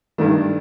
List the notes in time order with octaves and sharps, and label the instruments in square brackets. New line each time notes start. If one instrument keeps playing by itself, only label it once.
[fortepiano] G2 D#3 A3 D4